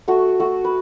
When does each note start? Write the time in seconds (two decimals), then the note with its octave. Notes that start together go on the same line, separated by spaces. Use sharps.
0.08 A3 F#4
0.39 A3 F#4
0.65 B4